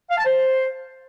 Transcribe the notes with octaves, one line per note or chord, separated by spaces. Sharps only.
F5
A5
C5